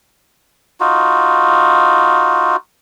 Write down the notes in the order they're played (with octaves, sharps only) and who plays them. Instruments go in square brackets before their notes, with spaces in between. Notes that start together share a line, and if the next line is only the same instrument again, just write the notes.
[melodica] D#4 F4 F#4